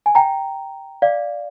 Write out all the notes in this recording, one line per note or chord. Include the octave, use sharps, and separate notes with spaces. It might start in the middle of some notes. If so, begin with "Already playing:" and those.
G#5
G5 A#5
D5 F5